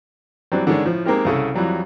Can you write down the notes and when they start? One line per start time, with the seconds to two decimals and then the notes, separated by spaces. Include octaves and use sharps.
0.52 E3 F#3 G3 C4 D4
0.67 D3 D#3 G#3 C#4 D4
0.84 A2 F3
1.05 G#3 A#3 C4 D#4 G4 A#4
1.25 C2 C#3 A4
1.54 F2 E3 F#3 G3